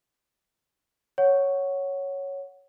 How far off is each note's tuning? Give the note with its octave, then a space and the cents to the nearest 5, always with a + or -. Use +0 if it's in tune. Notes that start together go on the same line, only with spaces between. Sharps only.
C#5 +0 F#5 +0